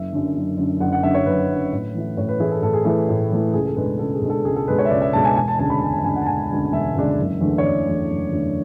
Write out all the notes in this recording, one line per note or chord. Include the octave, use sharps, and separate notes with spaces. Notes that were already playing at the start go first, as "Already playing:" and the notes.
Already playing: F#1 E5
F#2 D3
F#1
F#2 D3
F#1 F#5
F#5
F#2 D3 E5
C#5
F#1 B4
F#2 D3
A2
E3 A3 E4
A2 C#5
B4
E3 A3 E4 G#4
A4
A2 A4
G#4
E3 A3 E4 A4
A2
E3 A3 E4
C#2 G#4
A4
B2 G#3 D4 B4
C#2 A4
G#4
B2 G#3 D4
A4
C#2 G#4
A4
B2 G#3 D4 B4
C#5
E5
C#2 D5
E5
B2 G#3 D4 A5
G#5
E1 G#5
A5
D2 C#3 G#3 D4 A5
B5
E1 A5
A5
D2 C#3 G#3 D4 G#5
F#5
A5
E1 G#5
D2 C#3 G#3 D4
E1 E5
D2 C#3 G#3 D4
F#1
E2 D3 A3
C#5
F#1 D5
E2 D3 A3
F#1
E2 D3 A3